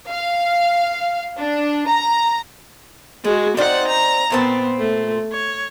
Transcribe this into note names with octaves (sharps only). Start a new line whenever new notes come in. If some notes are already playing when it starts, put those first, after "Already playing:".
F5
D4
A#5
G#3 F#4 G#4
C4 D#4 C5 D5 F#5
A#5
A#2 B3 C4 A5
A3
C#5